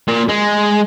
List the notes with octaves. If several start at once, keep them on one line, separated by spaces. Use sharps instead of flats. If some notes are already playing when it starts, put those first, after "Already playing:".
A#2
G#3